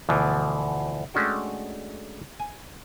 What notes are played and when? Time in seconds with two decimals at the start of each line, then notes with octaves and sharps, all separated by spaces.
0.09 D2 B2 E3 F3
1.14 G#3 A3 C#4 D4 F#4 G5
2.40 G#5